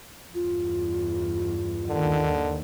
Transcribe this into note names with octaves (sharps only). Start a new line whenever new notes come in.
E2 G2 F4
D#2 D3 D#3